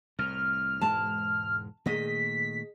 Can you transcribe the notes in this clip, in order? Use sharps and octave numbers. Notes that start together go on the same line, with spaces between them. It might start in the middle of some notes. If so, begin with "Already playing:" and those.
C2 A2 F6
E1 G#2 G#3 A5
A#2 D#3 A3 G#4 D#5 B6